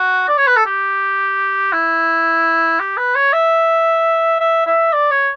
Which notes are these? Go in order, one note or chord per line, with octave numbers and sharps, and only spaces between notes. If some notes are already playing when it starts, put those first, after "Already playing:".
Already playing: F#4
D5
C#5
B4
A4
G4
E4
G4
B4
C#5
E5
E5
E5
D5
C#5